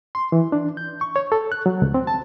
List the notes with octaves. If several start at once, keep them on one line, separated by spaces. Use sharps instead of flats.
C6
E3
D4
G6
C#6
C#5
A4
F#6
F#3
C#2
C4
A5